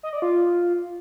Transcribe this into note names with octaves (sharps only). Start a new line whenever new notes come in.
D#5
D5
F4